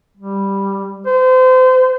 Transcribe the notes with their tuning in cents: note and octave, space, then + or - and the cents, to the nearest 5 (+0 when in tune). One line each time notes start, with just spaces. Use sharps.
G3 +5
C5 -30